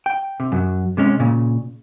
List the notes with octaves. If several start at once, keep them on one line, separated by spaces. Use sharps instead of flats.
G5
C3
F#2 F#3
C3 G#3 C#4
A#2 C#3